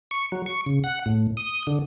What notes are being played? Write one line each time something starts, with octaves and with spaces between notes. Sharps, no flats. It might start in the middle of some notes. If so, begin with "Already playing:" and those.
C#6
F#3
C#6
C#3
F#5
A2
D#6
D3